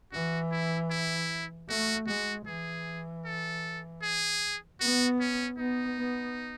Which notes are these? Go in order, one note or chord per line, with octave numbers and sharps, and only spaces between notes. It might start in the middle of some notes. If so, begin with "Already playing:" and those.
E3 F#4
E4
E4
A3 F#4
G#3 F#4
E3 G#4
A4
G#4
B3 F#4
C#4
B3 D#4
B3